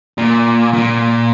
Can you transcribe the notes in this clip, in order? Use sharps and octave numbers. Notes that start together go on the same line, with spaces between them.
A#2
A#2